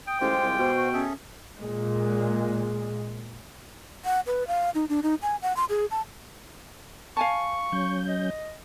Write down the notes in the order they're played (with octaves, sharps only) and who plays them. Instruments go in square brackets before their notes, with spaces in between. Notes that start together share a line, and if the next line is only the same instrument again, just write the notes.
[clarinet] G5 [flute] D#6
[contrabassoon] A1 [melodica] G#3 F4 G4 [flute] C5
[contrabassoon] C2
[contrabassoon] B2 [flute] C5
[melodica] F#4
[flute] C#4 [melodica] G#4 A4 E5
[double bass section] A#2 G#3
[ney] F#5
B4
F5
D#4
D4
D#4
G#5
F#5
C6
G#4
A5
[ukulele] F5 G#5 A5 [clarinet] C#6
[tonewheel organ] F#3 C#4 G6
[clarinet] D#5